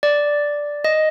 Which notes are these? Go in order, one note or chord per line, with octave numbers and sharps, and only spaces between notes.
D5
D#5